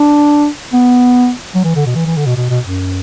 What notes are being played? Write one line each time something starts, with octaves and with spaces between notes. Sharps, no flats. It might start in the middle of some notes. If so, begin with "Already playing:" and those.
Already playing: D4
B3
F#3
E3
D3
B2
E3
E3
D3
B2
B2
B2
F#2